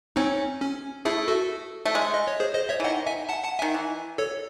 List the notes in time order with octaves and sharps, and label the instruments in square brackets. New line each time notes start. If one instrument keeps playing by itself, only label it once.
[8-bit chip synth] C4 D#4 [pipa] C#4
[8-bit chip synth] C#4
[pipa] A3 [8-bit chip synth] E4 G#4
[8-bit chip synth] F#4 A4
[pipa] A3
G#3
[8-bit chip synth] E5
D#5
C#5
G#4 C5
C5 D#5
C#5 E5
[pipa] E3
[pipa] D#3 [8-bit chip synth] D#5 F#5
[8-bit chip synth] E5 G#5
F#5 A5
F#5 A5
[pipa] D#3 [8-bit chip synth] E5 G#5
[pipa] E3
[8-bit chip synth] A4 C#5